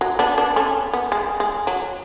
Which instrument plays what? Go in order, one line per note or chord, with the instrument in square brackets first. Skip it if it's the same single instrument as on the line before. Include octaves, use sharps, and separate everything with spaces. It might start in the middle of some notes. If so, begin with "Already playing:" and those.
[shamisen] F#3
B3 D4
B3 D4
A3 C#4
B3
G#3
G#3
F#3